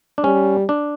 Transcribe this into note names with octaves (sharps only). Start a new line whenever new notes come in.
D4
G3 C#4
D4